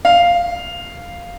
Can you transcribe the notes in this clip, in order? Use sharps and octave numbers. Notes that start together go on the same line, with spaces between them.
F5